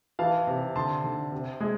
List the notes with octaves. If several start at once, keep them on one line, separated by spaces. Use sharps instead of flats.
E3 F5 A5
C3
D3 A5 C6
D3
C3
G#3